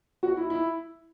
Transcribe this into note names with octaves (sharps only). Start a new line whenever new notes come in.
F#4
E4
E4